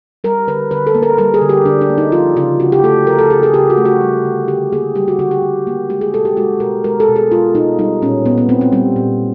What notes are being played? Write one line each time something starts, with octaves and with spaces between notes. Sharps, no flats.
G3 A#4
D3 B4
D3 B4
A4
A#3
A#4
G3 A#4
G#4
D3
G4
D3 D4
D4
A#3
D#4
F3 F4
C#3 F4
C#3 F#4
G4
A3 A4
F3 A#4
A4
C#3 G#4
G#4
C#3 G4
F#4
A3
F#4
G3
D3
D3 G4
A#3 G#4
G3 G4
F#4
D3 F#4
G4
D3
A#3
G#3 G4
G#4
B2 A4
G4
G#3 F#4
B2 A#4
G#3 A#4
A4
B2
G#4
G#3 F4
B2 D#4
G3 D#4
A#2 C#4
A#2 B3
B3
A#3 C4
C4
G3 C4
A#2